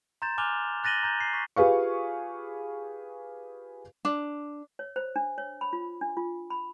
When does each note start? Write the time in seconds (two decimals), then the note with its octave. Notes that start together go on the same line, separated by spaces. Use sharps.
0.22 A#5 C6 G6 A6 E7
0.38 G#5 D6 F6 F#6 F7 G7
0.84 F#6 A6 A#6 D#7 F#7 G7
1.03 A#5 G6
1.20 C7
1.33 A#5 C#6 B6
1.56 F4 G4 G#4 B4 F5 C#6
4.05 D4
4.79 C#5
4.96 C5
5.16 D4
5.38 C#5
5.61 B5
5.73 F4
6.01 D4
6.17 F4
6.50 B5